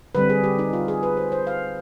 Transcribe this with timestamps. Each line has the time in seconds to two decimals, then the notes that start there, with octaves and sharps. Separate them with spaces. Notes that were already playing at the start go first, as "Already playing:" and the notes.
0.15 D3 G3 C4 B4
0.30 G#4
0.44 G4
0.59 D#4
0.73 F4
0.88 G#4
1.03 B4
1.17 C5
1.32 C5
1.47 F5